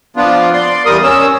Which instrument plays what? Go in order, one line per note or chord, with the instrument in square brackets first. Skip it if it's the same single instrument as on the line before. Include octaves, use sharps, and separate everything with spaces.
[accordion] F3 B3 D4 F4
D5 C6
E2 G3 A#4 D#6
C#4 E6